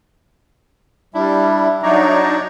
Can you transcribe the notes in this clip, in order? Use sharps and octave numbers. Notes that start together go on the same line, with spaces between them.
G3 D4 E4 E5
F#3 D4 D#4 C#5 D5 A#5